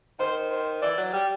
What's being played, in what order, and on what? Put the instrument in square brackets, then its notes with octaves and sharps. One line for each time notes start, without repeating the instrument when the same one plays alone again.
[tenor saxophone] D#3 [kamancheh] C5
[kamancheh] C5
[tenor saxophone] E3 [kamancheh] D5
[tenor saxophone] F#3
G3